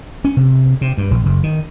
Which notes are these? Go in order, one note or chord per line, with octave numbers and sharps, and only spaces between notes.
C#4
C3
C3
G2
A#1
F#1
D#3